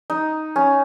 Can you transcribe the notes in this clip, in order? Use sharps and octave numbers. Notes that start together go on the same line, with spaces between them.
D#4
C#4